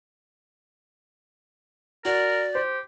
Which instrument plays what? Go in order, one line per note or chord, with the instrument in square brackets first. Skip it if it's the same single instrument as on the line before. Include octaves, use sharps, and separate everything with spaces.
[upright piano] F#4 [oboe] A#4 [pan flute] D5
[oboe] G4 [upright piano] C5